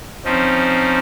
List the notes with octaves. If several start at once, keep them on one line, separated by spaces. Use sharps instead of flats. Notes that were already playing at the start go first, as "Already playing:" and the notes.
F3 C4 C#4 D#4